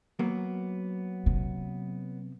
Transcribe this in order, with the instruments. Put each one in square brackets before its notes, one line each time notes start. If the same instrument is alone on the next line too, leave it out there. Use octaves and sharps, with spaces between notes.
[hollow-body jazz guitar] F#3 A#3 B3
[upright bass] C3